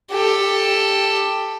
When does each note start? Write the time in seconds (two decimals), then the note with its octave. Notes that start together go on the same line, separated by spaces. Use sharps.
0.11 G4 A4